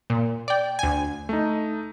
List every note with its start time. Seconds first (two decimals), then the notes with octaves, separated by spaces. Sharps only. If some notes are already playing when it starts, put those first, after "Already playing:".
0.10 A#2
0.48 D5 G5
0.79 D2 G#5
1.29 A3 D#4